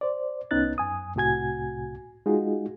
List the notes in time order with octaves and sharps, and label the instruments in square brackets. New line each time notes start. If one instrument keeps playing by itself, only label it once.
[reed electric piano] C5 D5
C2 B3 C#4 D#4 F#6 A6
F#2 G#5 D#6
C2 A2 C3 F#4 G#5 G#6
G#3 D#4 F4 F#4 G#4